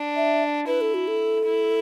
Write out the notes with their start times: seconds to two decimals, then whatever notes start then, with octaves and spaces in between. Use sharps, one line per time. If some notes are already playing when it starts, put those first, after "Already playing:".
Already playing: D4
0.16 E5
0.67 E4 B4
0.81 A4
0.94 F#4
1.08 A4
1.45 E4